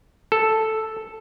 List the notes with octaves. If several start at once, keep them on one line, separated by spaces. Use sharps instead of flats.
A4